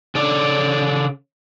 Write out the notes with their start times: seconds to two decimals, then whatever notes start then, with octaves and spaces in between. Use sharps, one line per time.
0.15 C#3 A4 D5